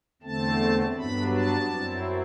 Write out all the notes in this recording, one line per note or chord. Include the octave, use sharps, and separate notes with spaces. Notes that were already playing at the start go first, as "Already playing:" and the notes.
E2 D3 A3 C4 A5
G2 F#3 B3 D4 B5
A5
F#2 F#3 C4 E4